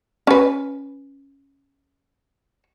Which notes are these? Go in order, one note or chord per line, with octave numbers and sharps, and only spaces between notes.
C#4 B4